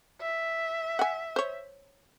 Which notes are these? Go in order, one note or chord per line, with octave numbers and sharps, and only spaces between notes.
E5
F#5 G#5
C5 C#5